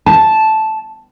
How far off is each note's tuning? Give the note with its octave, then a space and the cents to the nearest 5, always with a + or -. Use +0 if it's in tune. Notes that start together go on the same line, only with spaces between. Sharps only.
A5 -5